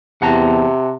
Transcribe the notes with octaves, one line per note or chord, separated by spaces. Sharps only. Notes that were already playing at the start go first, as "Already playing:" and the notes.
E2 C3 F#5 A5 A#5